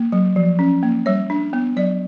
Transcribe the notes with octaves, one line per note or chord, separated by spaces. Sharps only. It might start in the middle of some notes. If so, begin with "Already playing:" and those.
Already playing: A#3
F#3
F3
C#4
A#3
G3 C#5
D4
B3
F#3 D5